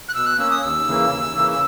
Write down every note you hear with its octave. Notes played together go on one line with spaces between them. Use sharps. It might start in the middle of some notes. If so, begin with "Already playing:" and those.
F#6
B2 E6
F#6
A#3 C#4 E6
D#6
D#2 E6
C#3 E3 A#3
D#2
C#3 E3 A#3
E6